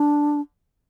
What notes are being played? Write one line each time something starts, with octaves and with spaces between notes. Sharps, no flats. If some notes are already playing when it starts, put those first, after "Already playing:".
Already playing: D4